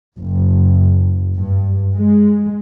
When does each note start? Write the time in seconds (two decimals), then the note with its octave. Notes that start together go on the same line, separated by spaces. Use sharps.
0.18 F#1
1.35 G2
1.95 G#3